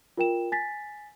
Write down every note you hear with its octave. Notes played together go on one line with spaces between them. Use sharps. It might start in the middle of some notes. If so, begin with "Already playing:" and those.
F4 A#4 G5 E7
G#5 A6 B6